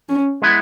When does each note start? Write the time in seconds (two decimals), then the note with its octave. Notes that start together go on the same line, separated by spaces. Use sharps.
0.09 C#4
0.42 G#3 B3 E4 B4